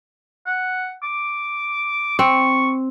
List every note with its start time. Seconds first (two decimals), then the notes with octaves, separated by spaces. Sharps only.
0.47 F#5
1.03 D6
2.19 C4 C#6